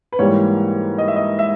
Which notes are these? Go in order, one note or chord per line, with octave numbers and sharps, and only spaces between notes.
B4
G#2 E3 G3 A#3 C#5
D#5
E5
D#5
E5